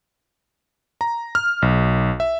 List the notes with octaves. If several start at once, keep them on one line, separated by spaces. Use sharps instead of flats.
A#5
F6
B1
E5